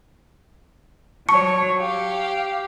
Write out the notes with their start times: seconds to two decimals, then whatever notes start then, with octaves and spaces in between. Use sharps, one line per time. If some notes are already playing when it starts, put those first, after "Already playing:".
1.29 F#3 C#5 A5 C#6 C#7
1.79 G4 F5